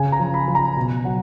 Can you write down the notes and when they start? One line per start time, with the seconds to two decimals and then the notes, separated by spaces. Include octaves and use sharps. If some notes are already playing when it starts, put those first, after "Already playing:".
Already playing: C#3 G#5
0.12 A#5
0.20 F3
0.34 B5
0.48 F3
0.55 A#5
0.77 B2
1.05 F#3 F#5